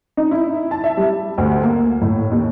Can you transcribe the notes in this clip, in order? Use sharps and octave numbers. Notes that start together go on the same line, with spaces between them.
D#4
E4
A5
E5
G3
D2
A#3
A2
D#2